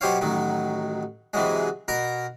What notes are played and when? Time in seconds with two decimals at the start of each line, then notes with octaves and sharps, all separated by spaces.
0.01 F#2 B2 G4 C5 C#5 F5
0.21 A1 D#3 F#3
1.34 C3 E3 F#3 G#3
1.88 B2 A#4 A#5